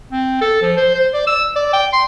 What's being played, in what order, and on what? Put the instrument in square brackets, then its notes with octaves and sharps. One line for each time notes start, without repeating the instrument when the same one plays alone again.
[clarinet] C4
A4
F3
C5
C5
D5
E6
D5
G5
C6